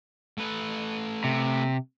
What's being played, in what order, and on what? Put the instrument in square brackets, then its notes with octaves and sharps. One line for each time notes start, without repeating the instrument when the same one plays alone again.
[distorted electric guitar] A3 B4
[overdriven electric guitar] C3